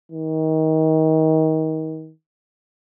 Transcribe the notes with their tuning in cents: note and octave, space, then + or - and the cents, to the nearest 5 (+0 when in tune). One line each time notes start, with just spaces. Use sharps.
D#3 +30